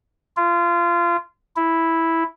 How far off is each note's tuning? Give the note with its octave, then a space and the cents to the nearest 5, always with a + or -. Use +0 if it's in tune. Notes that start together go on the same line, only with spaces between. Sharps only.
F4 -25
E4 -5